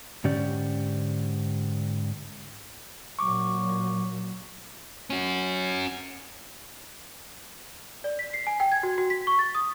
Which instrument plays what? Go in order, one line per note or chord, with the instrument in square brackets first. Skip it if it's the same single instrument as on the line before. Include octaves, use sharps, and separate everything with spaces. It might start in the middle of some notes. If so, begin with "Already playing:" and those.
[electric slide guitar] G#2 D3 C#4 G4 D5
[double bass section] A#2 F#3 [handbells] C#6 D6
[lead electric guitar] C#4 F#4
[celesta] D5
B6
C7
G#5
G5
G#6
F#4
F#4
B6
C#6
A6
D#6